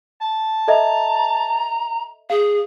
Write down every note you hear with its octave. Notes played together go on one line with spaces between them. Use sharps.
A5
A4 D#5 E5 A#5
G#4 F5